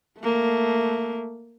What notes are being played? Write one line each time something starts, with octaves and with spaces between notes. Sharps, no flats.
A3 A#3